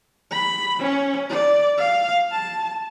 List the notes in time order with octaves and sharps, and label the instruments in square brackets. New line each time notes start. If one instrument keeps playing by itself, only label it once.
[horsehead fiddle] B5
C#4
D5
F5
A5